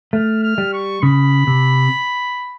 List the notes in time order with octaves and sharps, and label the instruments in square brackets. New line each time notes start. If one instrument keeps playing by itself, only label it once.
[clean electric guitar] A3 [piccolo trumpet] F6
[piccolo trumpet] F6
[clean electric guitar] G3
[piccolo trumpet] C#6
[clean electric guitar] C#3 [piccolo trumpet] B5
[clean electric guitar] C3